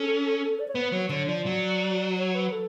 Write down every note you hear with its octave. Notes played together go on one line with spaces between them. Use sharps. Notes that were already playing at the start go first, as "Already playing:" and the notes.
Already playing: C#4 A4
D5
C#5
B3 B4
F#3 C#5
D3 C#5
F3 D5
F#3
C#5
B4
A4